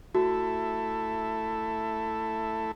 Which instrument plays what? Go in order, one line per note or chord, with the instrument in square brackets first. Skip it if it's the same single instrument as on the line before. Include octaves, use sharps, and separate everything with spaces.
[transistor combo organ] A3 E4 A4 [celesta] F#4